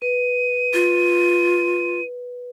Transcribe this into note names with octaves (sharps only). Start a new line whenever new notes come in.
B4 D#7
F4